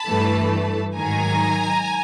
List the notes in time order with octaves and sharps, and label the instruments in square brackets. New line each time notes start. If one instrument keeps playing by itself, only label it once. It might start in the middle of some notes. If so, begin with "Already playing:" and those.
Already playing: [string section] A5 B5
G2 E3 A3
G#2 D#3 F#3 G#5 A#5